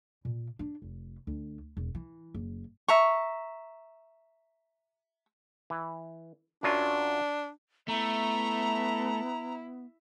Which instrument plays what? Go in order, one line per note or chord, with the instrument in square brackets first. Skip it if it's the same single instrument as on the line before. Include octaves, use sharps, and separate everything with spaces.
[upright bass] A#2
D4
F1
D2
E1
E3
F#1
[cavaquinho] E5 A#5 C#6
[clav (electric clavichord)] E3
[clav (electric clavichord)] F#2 F#3 F4 [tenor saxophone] D4
[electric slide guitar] A3 [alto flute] B3 [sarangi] E4 [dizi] A#5